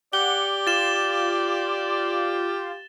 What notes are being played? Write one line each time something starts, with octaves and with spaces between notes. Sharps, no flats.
G4 D5 F#5 G7
F4 A6 E7 G7